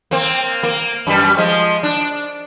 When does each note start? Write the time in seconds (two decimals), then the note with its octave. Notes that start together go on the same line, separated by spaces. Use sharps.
0.11 A#3 C4
0.63 A#3
1.07 F#2 G3
1.37 F3 G#3
1.83 D4